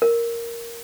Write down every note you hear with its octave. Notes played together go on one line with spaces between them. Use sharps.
A#4